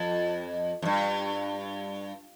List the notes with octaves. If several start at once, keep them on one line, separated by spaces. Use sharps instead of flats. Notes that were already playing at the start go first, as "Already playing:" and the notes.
Already playing: F2
F2
G2